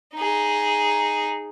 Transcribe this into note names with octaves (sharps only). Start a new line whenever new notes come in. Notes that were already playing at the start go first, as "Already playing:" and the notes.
D#4 G#4